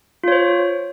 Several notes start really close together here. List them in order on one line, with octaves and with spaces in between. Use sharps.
F4 C#5 C5